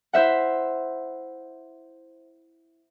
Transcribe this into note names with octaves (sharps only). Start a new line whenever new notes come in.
E4 C5 E5 F#5